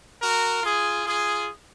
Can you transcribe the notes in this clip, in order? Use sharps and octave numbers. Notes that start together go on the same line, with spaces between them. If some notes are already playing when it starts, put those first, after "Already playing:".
F#4 A#4
F4 G#4
F4 G#4